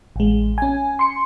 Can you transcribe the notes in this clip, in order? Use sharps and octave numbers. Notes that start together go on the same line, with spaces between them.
A1 G#3
C#4 G#5
C6 C#7